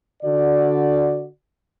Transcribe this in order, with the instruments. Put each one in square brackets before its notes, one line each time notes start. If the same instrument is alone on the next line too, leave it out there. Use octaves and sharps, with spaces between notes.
[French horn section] D3 F#4 D5